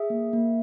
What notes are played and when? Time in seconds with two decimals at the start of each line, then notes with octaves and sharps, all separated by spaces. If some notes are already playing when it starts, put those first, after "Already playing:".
Already playing: G#4 E5
0.10 A#3
0.33 A#3